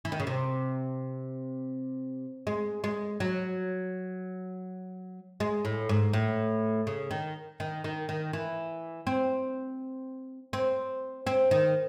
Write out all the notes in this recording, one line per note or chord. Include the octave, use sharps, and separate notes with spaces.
E3
D#3
C#3
C3
G#3
G#3
F#3
G#3
A2
G#2
A2
C#3
D#3
D#3
D#3
D#3
E3
C4
C4
C4
D#3